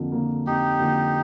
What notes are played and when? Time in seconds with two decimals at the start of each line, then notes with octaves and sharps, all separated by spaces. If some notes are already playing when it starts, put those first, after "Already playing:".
Already playing: F2 D3 F3 A#3
0.12 D3 F3 A#3
0.47 F2 D#4 G4
0.79 D3 F3 A#3